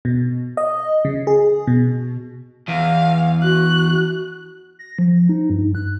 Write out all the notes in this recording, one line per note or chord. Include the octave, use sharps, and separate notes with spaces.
B2
D#5
C#3
G#4
B2
E2 F5
F#4 F#6
A#6
F3
D#4
G2
F#6